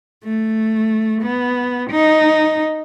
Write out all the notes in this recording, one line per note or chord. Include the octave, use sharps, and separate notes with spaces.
A3
B3
D#4